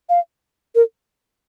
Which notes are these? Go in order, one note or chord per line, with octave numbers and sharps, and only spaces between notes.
F5
A#4